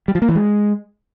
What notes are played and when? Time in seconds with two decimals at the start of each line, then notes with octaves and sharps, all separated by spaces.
0.08 G3
0.15 F3
0.22 A#3
0.29 E3
0.35 G#3